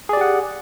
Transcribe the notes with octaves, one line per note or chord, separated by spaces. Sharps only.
G4 G#4 D5 F#5